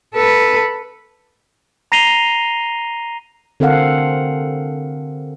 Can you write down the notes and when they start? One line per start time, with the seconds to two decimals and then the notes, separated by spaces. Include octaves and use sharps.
0.15 A4 B4
1.92 A#5 A#6 C7 D#7 F7 G7
3.60 D3 C4 A4 A#4 F5 F#5